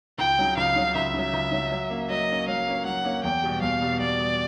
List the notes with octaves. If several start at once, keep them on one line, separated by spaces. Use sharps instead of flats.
C#2 G5
C#3 F#3
C#2 F5
C#3 F#3
C#2 E5
C#3 F#3
C#2
C#3 F#3
F#3
A#3 C#4
F#3 D#5
A#3 C#4
F#3 F5
A#3 C#4
F#3 F#5
A#3 C#4
E2 G5
B2 G3
E2 F5
B2 G3
E2 D5
B2 G3